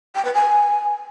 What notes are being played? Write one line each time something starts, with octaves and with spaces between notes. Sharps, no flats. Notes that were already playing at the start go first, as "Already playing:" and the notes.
G5
B4
G#5